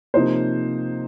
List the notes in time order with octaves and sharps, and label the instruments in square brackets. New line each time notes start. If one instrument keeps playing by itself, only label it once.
[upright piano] C3 F3 A#3 D#4 C5